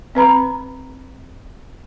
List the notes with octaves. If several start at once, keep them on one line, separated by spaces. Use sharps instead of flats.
C4 B4 A#5 B5